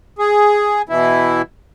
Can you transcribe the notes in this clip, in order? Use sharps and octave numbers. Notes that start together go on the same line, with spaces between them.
G#4
B2 E3 E4